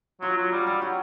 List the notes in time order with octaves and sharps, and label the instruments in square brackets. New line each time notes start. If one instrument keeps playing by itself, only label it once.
[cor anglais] F#3 [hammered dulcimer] F4
[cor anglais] F#3
[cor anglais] G3 [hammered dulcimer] F#4
[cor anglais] G3 [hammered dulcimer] G4
[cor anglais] F#3 [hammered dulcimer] F#4